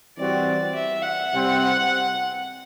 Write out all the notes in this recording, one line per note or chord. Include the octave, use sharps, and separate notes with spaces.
E3 G3 C4 F#4 D5
E5
F#5
C3 G3 C4 E4